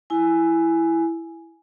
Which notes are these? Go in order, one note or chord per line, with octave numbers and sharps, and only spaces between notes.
E4 G#5